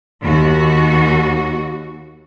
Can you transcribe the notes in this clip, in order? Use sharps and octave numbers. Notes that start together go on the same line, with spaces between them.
D#2 F#4